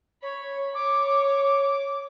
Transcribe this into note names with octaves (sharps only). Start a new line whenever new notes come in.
C#5 B5
C#5 D6